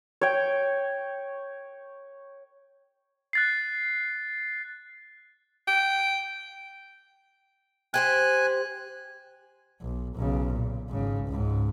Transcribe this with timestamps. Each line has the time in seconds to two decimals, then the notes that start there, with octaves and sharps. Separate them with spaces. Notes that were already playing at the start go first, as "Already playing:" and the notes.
0.21 C#5 G5
3.33 F#6 A6 C7
5.68 G5
7.94 G4 B4 C5 G#5 F#6
9.81 B1
10.15 B1 C#3
10.52 A#2
10.89 G#1 C#3
11.27 C#2 G#2